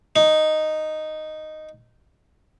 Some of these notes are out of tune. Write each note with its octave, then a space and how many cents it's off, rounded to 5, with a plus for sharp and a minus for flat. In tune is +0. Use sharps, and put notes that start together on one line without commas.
D#4 -5